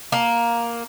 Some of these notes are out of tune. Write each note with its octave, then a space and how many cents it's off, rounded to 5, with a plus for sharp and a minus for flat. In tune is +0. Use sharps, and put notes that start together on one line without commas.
A#3 +5